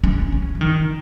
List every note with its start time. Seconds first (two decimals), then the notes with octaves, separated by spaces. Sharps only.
0.04 C#4
0.32 C#4
0.55 F3
0.61 D#3